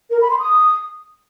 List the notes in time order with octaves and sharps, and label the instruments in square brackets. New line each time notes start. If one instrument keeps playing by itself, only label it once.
[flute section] A#4
B5
C6
D#6